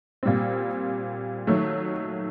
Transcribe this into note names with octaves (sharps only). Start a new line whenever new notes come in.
A#2 G3 C4
D#3 F#3 A3